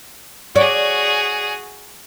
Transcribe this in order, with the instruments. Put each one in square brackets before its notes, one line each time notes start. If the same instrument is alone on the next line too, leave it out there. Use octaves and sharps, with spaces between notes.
[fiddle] F#4 G#4 [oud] C#5 D5